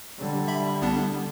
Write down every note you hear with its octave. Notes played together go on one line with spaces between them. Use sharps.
D3 G3
E5 B5
C2 B3 D4